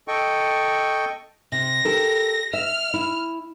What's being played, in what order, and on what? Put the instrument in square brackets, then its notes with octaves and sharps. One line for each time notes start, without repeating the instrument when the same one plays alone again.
[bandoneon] A4 D#5 G5 C#6
[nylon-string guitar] C3 [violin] A#6
[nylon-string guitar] G4 A4 A#4
[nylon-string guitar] E5 [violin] F6
[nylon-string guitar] E4